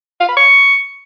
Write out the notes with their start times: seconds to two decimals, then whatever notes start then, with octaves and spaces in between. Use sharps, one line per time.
0.20 F5
0.29 B5
0.37 C#6